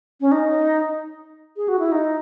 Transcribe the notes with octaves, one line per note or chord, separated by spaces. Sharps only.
C#4
D#4
G#4
F#4
E4
D#4